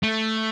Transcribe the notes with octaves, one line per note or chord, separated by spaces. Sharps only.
A3